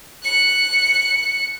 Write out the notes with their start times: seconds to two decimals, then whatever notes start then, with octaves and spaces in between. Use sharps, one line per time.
0.23 F#6 C#7